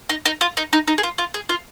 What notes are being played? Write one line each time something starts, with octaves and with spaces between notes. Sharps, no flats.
D#4
D#4
F4
D#4
D#4
D#4
G#4
F4
F4
G#4
F4